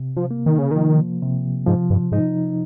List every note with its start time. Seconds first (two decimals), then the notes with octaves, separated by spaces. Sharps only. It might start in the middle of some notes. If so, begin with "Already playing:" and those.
Already playing: C3
0.17 F3
0.31 A#3
0.46 D#3
0.59 C#3
0.71 D#3 F3
1.22 C3
1.67 G#2 F3
1.90 G2
2.12 G#2 D#4